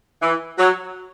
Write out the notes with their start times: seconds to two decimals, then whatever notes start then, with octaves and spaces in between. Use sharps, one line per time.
0.22 E3
0.58 F#3